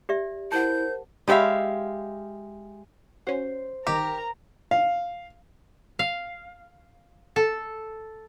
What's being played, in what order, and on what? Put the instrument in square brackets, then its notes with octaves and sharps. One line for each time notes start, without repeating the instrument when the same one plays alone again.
[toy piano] G4 D5 E5
[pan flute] E4 [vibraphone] A#4 C5 [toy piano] F#5 A5 [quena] G6
[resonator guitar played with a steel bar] G#3 G4 B4 E5 F5
[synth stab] C#4 F#4 [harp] C5
[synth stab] G1 D#3 [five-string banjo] G4 [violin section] A#4 A#5
[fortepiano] F5
[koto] F5
A4